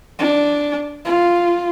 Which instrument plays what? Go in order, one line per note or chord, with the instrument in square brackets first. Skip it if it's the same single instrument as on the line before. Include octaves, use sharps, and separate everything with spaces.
[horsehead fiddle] D4
F4